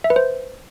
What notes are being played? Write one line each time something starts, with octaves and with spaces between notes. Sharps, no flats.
E5
B4
C5